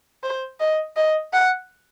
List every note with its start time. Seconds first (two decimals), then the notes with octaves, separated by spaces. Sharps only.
0.23 C5
0.60 D#5
0.96 D#5
1.33 F#5